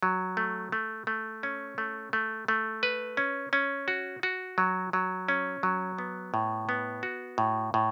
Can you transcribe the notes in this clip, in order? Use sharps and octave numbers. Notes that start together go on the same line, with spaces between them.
F#3
A3
A3
A3
C#4
A3
A3
A3
B4
C#4
C#4
F#4
F#4
F#3
F#3
C#4
F#3
B3
A2
B3
F#4
A2
A2